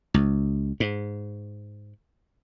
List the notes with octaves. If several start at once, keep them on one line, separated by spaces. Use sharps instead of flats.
C#2
G#2